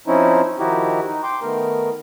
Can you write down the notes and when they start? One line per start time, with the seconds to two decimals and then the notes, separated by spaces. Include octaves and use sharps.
0.07 F3 C4 C#4 D#4 E4
0.59 D#3 F3 D#4 E4 F#4 G4
1.07 D#4
1.23 G5 C6 D6
1.42 D#3 A3 B3 A#4